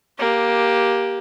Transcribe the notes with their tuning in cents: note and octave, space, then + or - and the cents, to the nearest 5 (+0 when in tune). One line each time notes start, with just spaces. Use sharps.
A#3 +10 G4 +0